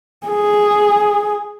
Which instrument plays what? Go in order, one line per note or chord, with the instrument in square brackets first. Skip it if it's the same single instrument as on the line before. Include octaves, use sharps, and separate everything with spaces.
[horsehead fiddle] G#4